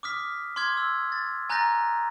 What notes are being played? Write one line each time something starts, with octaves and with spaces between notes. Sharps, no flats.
D6 D#6 F6 B6
C6 D6 F6 G#6
E6
A6
G#5 A#5 F#6 G6 A6 A#6